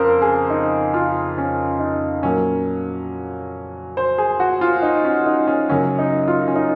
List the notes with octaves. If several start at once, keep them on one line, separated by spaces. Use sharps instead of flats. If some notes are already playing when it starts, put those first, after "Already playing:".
Already playing: F2 C#3 A#4 C5
G#4
D#4
F4
C#4
D#4
A#2 F#3 A#3 C#4
C5
G#4
F#4
F4
D#4
C#4
D#4
C#4
F#2 C#3 F#3 C#4
D#4
F4
C#4
D#4